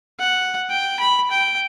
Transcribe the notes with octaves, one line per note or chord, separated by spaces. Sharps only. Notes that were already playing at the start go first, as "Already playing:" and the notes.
F#5
G5
B5
G5